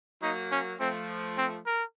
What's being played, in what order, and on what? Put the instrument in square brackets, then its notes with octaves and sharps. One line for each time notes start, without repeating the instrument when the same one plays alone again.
[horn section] F#3 A#3 [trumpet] D#4
[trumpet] C#4
[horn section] F3 A3 [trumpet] C4
[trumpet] C4
A#4